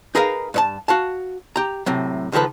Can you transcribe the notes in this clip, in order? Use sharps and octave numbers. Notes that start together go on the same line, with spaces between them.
D#4 G#4 A#4 B4 F5
G2 C#5 A5
F#4 F5 A5
G4 A#5
A2 C3 F#3
C#2 D#3 F3 A4 B4